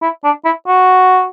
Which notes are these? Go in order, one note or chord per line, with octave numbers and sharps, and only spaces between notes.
E4
D4
E4
F#4